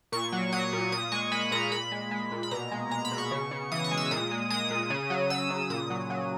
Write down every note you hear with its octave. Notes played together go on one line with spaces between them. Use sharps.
A#2 C#6
F#3
F#3 D#6
A#2
A#2 D#6
G#3 C#6
G#3 B5
A#2 A#5
A#2 B5
G#3
G#3
A#2
B5
B2 A#5
G#3
G#3 A#5
B5
B2
C#6
C#3
C#3
E3 D#6
C#6
G#3
E6
A#2 D#6
G#3
G#3 D#6
A#2
C#3
F#3
F#3 E6
C#3
A#2 D#6
F#3
F#3